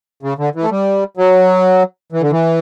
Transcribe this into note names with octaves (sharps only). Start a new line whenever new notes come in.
C#3
D3
E3
A3
G3
F#3
E3
D3
E3